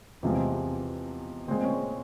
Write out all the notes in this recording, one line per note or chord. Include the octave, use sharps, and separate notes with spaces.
E2 C3 F3 G#3
A#2 G#3 C4
C#4